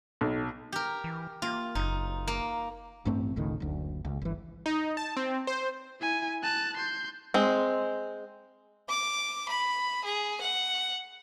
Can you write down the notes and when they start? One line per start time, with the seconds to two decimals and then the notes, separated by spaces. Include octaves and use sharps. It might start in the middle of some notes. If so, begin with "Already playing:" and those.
0.21 B1
0.72 G4 A#4
1.04 E3
1.42 A#3 F4
1.75 F#1 D#4
2.27 A#3
3.05 A1 G2 A3 C4
3.36 F1 C#2 A2 D#3
3.60 F#1 D2
4.05 C#2
4.22 G1 E3
4.66 D#4
4.97 A5
5.17 C4
5.47 C5
6.01 E4 G#5
6.43 A5 F#6
6.77 C6 G6
7.34 G#3 C4
8.89 D6
9.49 B5
10.05 G#4
10.41 F#5